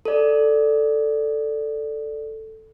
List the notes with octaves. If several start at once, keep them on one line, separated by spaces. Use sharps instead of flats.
A4 D5